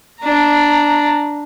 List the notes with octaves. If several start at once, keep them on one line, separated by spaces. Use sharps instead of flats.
D4 A#5